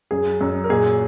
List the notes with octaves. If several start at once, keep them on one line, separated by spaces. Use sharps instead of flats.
F#2 G#4
F#2
A#4
A#2 G#4